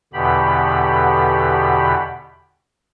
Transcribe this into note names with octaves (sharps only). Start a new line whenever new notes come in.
E2 B2 D3 G4 B5